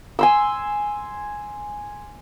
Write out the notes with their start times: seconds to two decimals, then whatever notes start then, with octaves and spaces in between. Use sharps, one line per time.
0.19 G#5 C6 E6